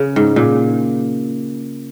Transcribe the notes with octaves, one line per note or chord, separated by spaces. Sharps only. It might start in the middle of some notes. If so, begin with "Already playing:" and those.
Already playing: C#3
G#2
A#2